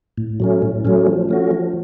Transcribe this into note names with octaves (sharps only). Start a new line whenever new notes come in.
A2
F#3 A3 C#4
A2
F#3 A3 C#4
F3
A3 C#4 F#4
F3